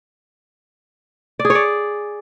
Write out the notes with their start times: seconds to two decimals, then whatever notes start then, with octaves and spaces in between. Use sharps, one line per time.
1.39 D5
1.45 G#4
1.50 C#5
1.55 D5